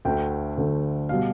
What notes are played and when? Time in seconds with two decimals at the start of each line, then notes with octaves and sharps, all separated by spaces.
0.05 D2 D3 A3 G5
0.58 D2 D3 A3
1.09 B2 G3 F5